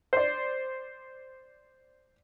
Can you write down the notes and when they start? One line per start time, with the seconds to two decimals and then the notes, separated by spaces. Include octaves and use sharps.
0.13 C5 D5